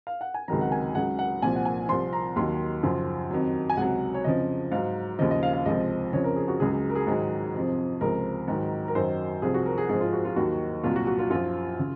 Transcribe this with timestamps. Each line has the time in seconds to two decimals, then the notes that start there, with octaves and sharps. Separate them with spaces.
0.07 F5
0.21 F#5
0.34 G#5
0.48 C#2 C3 D#3 F#3 A#5
0.61 F#5
0.72 G#5
0.95 C#2 C#3 F#3 F#5
1.19 F#5
1.42 C2 A#2 F3 G#5
1.56 F#5
1.65 G#5
1.89 C2 C3 F3 C6
2.13 A#5
2.36 D#2 D#3 F#3 C6
2.83 F#2 C#3 F3
3.31 F2 D#3 F#3
3.70 G#5
3.77 C#2 C3 F#3 F#5
4.14 C#5
4.24 F2 C#3 F3 D#5
4.72 G#2 F#3 F5
5.19 D#2 C#3 F3 D#5
5.31 D#5
5.43 F5
5.53 F5
5.66 C#2 C3 F3 D#5
6.13 F2 C#3 F3 C#5
6.24 A#4
6.36 G#4
6.48 F#4
6.60 C#2 C#3 F#3 G#4
6.71 G#4
6.90 A#4
6.95 G#4
7.07 G#2 D#3 F#3
7.54 F2 C3 F3
8.01 C#2 C3 F3 A#4
8.48 G#2 D#3 F#3
8.88 A#4
8.95 F#2 D#3 F#3 C5
9.42 C2 C3 F3 G#4
9.54 F#4
9.66 A#4
9.78 G#4
9.89 G#2 F3 G#4
10.01 F4
10.13 F#4
10.25 F4
10.36 D#2 D#3 F#3 F#4
10.84 C2 A#2 F#3 F4
10.96 F#4
11.07 F#4
11.19 F4
11.30 F#2 F3 F4
11.79 C#3